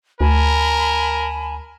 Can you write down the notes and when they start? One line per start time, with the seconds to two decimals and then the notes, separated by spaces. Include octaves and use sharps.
0.21 D2 A#4 G#5 A5 B5